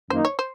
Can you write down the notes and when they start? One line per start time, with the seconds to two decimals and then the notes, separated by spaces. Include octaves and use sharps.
0.10 F#2 D#3 A#3 D#4 C5
0.25 C#5
0.39 C5